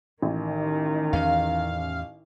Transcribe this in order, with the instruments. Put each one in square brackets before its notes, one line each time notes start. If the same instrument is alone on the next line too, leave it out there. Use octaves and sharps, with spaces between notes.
[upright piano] A1 [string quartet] D#3
[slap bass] E2 C#4 [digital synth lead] F5